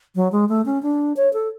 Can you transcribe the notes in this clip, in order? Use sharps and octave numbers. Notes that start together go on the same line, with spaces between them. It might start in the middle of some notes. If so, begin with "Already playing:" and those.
F#3
G#3
A3
C#4
D4
C#5
A4